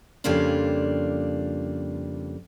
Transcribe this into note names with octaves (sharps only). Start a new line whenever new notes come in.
F2 C#3 G3 A#3 D4 F4